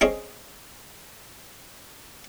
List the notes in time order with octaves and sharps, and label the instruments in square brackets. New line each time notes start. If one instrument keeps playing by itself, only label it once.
[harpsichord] C4 C#4 G#4 D#5